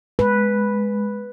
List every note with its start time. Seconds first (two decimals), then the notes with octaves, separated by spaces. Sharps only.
0.19 G#3 B4